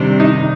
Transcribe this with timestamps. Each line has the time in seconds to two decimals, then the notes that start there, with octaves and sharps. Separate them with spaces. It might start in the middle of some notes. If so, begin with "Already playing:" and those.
Already playing: C3 D#3 G3 C4 D4
0.20 D#4